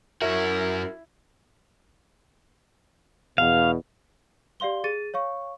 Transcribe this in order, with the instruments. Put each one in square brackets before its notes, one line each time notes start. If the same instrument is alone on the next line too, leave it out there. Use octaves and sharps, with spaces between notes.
[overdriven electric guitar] F#2 F#4 [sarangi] E4 [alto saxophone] A#4 [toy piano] E5
[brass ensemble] E2 B2 [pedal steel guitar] F5
[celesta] G4 D5 F5 C6 G7
G#4 A6 D#7
C#5 F5 C#6